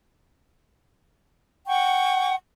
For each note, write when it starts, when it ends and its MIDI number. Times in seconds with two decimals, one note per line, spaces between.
1.67 2.35 78
1.67 2.35 79
1.67 2.35 85